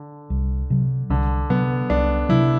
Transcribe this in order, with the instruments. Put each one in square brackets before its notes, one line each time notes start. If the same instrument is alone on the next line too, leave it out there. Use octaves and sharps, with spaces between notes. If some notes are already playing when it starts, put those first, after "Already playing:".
Already playing: [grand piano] D3
[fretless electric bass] C2
C3 F#3
[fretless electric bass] C2 [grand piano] D3
[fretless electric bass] C3 F#3 [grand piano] B3
[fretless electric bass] C2 [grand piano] D4
[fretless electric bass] C3 F#3 [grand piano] E4